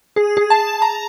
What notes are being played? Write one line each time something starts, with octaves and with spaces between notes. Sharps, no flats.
G#4
G#4
A5
A#5